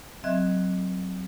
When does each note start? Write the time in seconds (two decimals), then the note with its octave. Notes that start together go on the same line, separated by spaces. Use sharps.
0.24 F#3 C4 D#5 E5 F#6 G#6